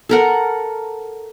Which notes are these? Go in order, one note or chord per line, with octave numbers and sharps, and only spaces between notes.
A4 A#4 F#5